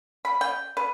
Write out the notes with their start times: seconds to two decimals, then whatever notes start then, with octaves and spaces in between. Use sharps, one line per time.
0.25 B5
0.41 G5
0.77 B4